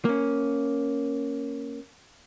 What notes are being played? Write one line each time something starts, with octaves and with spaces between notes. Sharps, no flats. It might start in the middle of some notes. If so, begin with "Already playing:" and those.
A#3 C#4